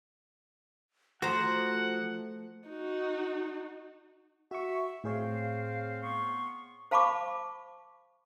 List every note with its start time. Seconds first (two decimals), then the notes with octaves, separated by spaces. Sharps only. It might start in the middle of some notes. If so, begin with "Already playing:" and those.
1.22 F3 A3 F#4 C5 F#5 A#5
2.68 D#4 F#4
4.51 F#4 E5 C#6
5.04 A2 C4 G#4 C5 C#5 F5
6.02 B3 C6 C#6
6.91 C5 F5 A5 B5 C#6 D6